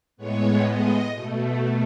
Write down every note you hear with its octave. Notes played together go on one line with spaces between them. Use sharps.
A2 G#3 B3 C#5
D#5
B2 A3